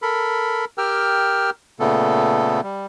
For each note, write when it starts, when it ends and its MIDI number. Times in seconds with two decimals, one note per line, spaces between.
0.02 0.65 69
0.02 0.65 70
0.02 0.65 83
0.78 1.50 67
0.78 1.50 70
0.78 1.50 79
0.78 1.50 88
0.78 1.50 89
1.80 2.61 46
1.80 2.61 49
1.80 2.61 57
1.80 2.61 59
1.80 2.61 69
2.63 2.86 55